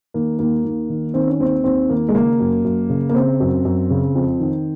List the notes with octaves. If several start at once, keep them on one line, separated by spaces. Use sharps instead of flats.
D#3 A#3
D#2 A#3
D#2
D#3
D#3 C4
C#4
D#2 C4
D#2 C4
D#3 A#3
G#3
C#3 A#3
F#2
F#2
C#3
A#3
C#3 C4
F#2
F#2
C#3
F2
D#3